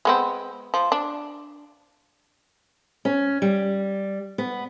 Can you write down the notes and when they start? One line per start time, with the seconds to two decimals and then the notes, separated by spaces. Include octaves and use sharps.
0.05 G#3 B3 C4
0.74 F3
0.92 D4
3.05 C#4
3.42 G3
4.38 B3